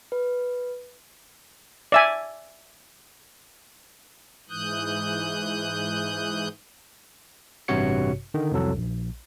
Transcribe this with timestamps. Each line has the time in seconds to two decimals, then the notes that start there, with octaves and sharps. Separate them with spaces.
0.12 B4
1.92 D5 E5 G#5
4.50 G#2 E3 D#6 F#6 G6
7.68 A1 G2 C3 F#4 C#5 C#7
8.34 D3 D#3
8.52 C2 F2 F#3 A4
8.76 A#1